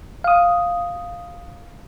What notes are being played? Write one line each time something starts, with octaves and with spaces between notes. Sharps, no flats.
F5 D#6